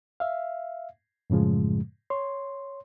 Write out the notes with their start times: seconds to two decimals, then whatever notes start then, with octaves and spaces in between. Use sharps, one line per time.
0.20 E5 F5
1.30 F#2 A2 C#3 F3 G#3
2.10 C#5 C6